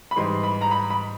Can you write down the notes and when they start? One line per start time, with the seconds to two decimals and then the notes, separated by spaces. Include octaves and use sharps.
0.11 B5
0.16 G#2 E3 G3 C6
0.43 B5
0.61 A#5
0.71 B5
0.90 B5